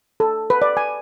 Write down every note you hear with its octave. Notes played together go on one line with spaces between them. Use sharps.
A4
B4
D5
G#5